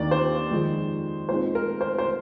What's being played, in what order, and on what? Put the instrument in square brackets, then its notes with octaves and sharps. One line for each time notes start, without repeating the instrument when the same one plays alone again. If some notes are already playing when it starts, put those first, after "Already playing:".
Already playing: [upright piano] D#2 D#3 A#3 D4 D5
C5
F2 D#3 G#3 D#4
A#2 G#3 C4 D#4 C5
A#4
C5
C5